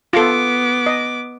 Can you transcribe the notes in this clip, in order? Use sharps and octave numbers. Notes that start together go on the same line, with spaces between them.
B3 F4 A4 D6
D#5